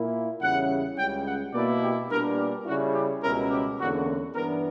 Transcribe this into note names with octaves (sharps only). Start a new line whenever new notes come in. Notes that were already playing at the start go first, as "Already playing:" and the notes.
Already playing: A#2 A#3 E4
E2 C#3 G3 C#4 E4 F#5
C#2 C#3 G3 C#4 G5
F#5
B2 A#3 E4 D5
G4
A#2 G3 B3 D4 A#4
G4
C#3 G3 C#4 E4 F#4
G4
C#2 B2 G3 C#4 E4 A#4
G4
E2 D3 A#3 C#4 F#4
G2 E3 B3 D4 A#4